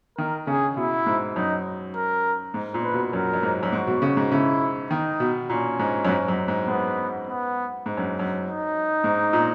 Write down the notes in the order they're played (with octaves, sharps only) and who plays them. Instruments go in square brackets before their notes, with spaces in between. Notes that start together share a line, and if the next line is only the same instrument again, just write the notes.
[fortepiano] D#3 [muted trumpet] A#4
[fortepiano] C#3 [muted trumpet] G#4
[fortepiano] B2 [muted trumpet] E4
[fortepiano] G#2
[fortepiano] F#2 [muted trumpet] D#4
[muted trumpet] A#4
[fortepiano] G#2
A#2
[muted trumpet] B4
[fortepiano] B2
[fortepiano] F#2 [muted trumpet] A#4
[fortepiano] F#2
G#2
F#2
[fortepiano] G#2 [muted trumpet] F#4
[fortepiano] B2
C#3
G#2
[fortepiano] C#3 [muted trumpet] E4
[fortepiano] D#3 [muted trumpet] D#4
[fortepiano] B2
[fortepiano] A#2 [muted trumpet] C#4
[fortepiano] G#2
F#2
G#2
F#2
G#2
[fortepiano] G#2 [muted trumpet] B3
[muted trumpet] B3
[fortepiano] G#2
F#2
F#2
[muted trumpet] D#4
[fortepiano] G#2
A#2